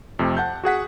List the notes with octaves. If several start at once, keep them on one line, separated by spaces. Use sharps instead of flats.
F2 C3 A3
F#5 A5 G6
F#4 G#4 F#5 B6